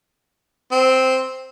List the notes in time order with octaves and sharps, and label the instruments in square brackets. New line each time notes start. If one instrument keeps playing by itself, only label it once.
[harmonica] C4